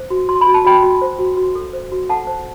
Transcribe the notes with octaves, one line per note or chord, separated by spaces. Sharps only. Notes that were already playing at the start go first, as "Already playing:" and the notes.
Already playing: C5
F#4
F#4 C6
B5
F#4
A5
F#4 G5 B5
F#4
C5
F#4
F#4
A4
C5
F#4
A4 F#5 A5
C5